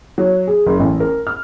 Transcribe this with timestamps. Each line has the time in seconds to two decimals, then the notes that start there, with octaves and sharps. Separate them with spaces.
0.18 F#3
0.47 G#4
0.66 F#1
0.80 A1
1.00 A#4
1.27 F6